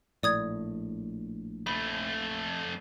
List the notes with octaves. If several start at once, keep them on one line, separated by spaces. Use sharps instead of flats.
A#1 A2 D5 D#6 G#6
F2 A3 B5